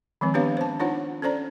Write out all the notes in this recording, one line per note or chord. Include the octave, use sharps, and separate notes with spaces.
D#3 F3 G#3 C4
B3 D4 G4 B4 C#5 F5
C5 A5
D4 D#4 F4 C5 C#5 F#5
C#4 A4 C5 D5 A#5